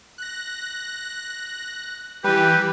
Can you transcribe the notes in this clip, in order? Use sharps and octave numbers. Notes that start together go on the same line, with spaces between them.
F#6 A#6
E3 G3 G4 B4